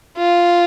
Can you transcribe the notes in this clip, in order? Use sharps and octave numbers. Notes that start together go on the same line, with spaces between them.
F4